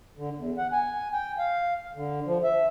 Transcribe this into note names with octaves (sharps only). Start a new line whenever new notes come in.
D3
E2
F#5
G#5
G5
F5
D3
F3
E5